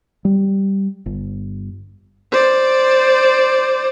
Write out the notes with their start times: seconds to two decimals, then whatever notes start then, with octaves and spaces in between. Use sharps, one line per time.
0.25 G3
1.06 G1
2.32 C5 D5